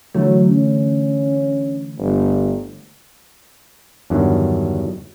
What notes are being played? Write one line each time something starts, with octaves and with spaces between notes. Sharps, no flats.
D3 E3 F#3 A3
C#4
G1
E2 G2 D3 D#3 F#3